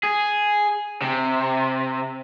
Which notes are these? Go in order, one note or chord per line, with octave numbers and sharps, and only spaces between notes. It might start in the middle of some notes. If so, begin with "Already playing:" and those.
G#4
C3